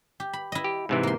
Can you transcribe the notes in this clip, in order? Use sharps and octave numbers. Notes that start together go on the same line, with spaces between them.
G4
B5
E4 D#5
G4
G#2 C3 E3
A#3 C6